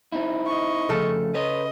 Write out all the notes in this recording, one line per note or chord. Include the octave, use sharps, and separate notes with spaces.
C4 D#4 E4
D#5 C#6
F2 C#3 A3 A4
B4 C#5 D#5